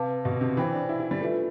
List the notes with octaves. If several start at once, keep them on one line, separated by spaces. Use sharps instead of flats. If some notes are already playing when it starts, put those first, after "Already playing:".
Already playing: C3 B4 F5 A5 D6
B2
C3
E3 C5 G5 B5
D4
E4
E4
G3
A3 D4 F4 B4 E5